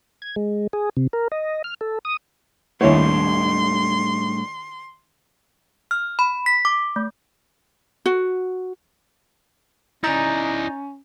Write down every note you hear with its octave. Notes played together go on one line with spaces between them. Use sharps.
G#6
G#3
G#4
C3
A#4
D#5
F6
A4
D#6
D#2 A2 G3 D4 E4 C#5 C6
F6
B5
B6
D6
A3
F#4
C#4 D#4 E4 D5 A#5 G6 A6